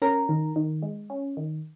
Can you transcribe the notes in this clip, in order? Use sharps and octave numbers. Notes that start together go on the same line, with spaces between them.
C#4 A#4 A#5
D#3
D#3
G#3
C#4
D#3